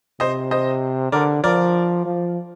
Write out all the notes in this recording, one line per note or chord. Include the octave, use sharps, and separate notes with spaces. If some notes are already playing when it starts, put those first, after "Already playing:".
C3 C5 D#5
C5 D#5
D3 A#4 D5
F3 A#4 D5
F3